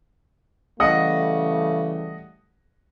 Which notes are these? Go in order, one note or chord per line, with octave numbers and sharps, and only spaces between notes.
C#3 E3 G3 A3 D#5 F#5 D#6